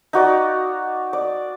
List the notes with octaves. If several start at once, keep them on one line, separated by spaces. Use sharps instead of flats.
D#4 F#4 D5
D5